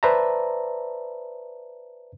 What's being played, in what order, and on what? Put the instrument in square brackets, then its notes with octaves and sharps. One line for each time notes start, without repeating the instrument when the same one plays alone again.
[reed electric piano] B4 C5 D5 E5 A5 A#5